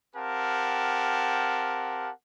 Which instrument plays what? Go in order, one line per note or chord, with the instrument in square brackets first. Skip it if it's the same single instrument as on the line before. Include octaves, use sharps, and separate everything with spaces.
[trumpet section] C4 G4 A#4 F5 F#5 A5